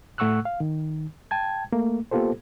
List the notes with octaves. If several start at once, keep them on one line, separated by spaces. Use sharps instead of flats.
A2 A3 F#5 C#6 E6 F#6
F5
D#3
G5 A5 G#6
A3 A#3
A#3 B3 F4 G4 A4 C5